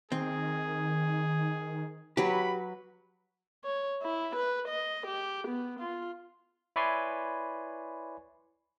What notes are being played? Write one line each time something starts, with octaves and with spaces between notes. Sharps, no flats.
D#3 C4 G#4
F#3 G4 B4 B5
C#5
E4
B4
D#5
G4
B3
F4
E4 B4 C#5 D5 G#5 C6